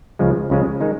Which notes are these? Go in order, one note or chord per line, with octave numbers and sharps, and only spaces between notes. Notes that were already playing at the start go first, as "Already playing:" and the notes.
C#2 C#3 F3 G#3
C#2 C#3 F3 G#3
D#3 G#3 D#4